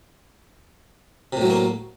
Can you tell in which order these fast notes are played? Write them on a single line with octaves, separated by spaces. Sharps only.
C3 A2 F#3 A3 A#3